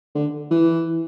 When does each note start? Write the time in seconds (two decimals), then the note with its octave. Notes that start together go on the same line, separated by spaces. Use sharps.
0.15 D3
0.51 E3